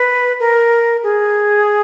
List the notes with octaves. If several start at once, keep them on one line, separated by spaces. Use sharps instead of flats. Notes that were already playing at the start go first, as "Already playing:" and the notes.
Already playing: B4
A#4
G#4